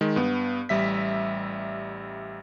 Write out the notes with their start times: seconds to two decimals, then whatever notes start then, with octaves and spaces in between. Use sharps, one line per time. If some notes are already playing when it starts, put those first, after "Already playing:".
0.01 D#3 G#3
0.16 G2 B3
0.69 A1 G3 E5 B6